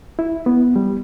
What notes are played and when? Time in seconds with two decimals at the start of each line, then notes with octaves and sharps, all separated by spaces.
0.19 E4
0.46 B3
0.76 G3